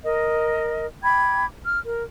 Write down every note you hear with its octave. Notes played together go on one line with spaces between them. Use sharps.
A#4 D#5
G5 B5 D6 G#6
F6
A#4